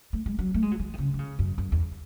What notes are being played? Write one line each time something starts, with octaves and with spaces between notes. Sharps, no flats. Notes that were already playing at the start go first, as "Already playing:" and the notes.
A3
G#3
F#3
A3
G#3
F#3
E3
D#3
C#3
D#3
C#3
F#2
F#2
E2